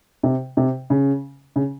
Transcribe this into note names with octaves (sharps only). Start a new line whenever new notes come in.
C3
C3
C#3
C#3